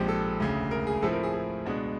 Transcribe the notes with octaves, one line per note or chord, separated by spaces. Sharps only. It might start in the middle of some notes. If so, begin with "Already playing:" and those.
Already playing: A#1 G#2 F3 G#3 C4 G4
A4
E1 D2 C#3
A#4
G#4
A2 F3 A3 C4 E4 A4
A#4
G#4
G#4
C#2 B2 G#3 B3 D4